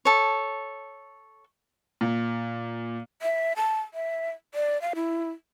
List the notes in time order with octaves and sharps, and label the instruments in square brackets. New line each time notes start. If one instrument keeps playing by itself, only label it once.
[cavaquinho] A4 C#5
[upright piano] A#2
[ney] E5
A5
E5
D5
F5
E4